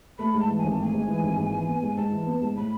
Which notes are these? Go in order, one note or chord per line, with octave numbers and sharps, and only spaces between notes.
A3 B5
G#2
A5
E3
G#5
G#1
A5
A3 G#5
G#2
E3
G#1
G#2
E3
B3
G#2
G#2 A5
E3
B3
G#2
A2 B5